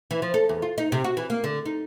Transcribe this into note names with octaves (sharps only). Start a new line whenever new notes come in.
E3
F3
A4
E2
F4
D#4
C3
F#4
E3
A#3
D3
D#4